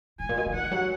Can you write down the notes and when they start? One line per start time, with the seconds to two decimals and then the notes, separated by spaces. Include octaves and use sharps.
0.20 G#2 G#5
0.29 A#2
0.37 B2
0.46 C#3
0.54 D#3 F#5
0.71 F#3